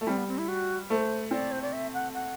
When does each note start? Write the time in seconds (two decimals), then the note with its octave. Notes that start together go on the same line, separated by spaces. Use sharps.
0.01 A3
0.07 G3 C4
0.17 B3
0.28 C4
0.38 E4
0.48 F#4
0.90 A3 C5
1.31 C4 D5
1.52 C5
1.62 D5
1.73 E5
1.94 F#5
2.14 F#5